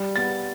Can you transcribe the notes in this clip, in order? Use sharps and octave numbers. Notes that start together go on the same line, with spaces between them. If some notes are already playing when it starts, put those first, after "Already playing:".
Already playing: G3
B3 A6